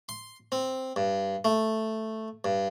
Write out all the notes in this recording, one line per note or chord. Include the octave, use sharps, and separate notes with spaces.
C6
C4
G2
A3
G2